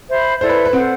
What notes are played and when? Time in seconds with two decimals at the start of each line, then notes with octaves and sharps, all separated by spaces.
0.09 C5 E5 B5
0.41 E4 A4 C5 D5
0.49 B4
0.65 B4
0.73 C4 F#5
0.76 A4 C5